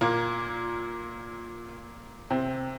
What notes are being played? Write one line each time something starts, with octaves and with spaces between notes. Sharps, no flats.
A#2 A#3
C3 C4